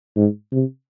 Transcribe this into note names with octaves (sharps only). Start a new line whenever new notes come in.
G#2
C3